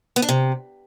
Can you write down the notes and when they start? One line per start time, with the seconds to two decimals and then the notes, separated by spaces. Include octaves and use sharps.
0.16 B3
0.22 D4
0.29 C3